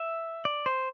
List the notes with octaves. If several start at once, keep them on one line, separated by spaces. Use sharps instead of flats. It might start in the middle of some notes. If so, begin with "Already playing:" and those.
Already playing: E5
D5
C5